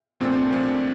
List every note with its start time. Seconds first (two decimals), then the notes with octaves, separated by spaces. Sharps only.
0.20 C2 A#2 F3 A3 C4 D4
0.50 C2 A#2 F3 A3 D4